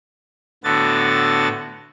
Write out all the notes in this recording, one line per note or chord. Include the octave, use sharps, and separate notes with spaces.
A2 D3 B3 F#4 A6